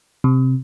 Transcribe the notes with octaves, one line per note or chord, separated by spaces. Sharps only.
C3